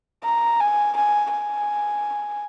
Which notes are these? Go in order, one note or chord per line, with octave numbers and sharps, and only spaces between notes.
A#5
G#5
G#5
G#5